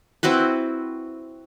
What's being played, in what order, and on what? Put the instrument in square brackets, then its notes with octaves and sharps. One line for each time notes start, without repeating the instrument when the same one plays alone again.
[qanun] C4 E4 F#4 B4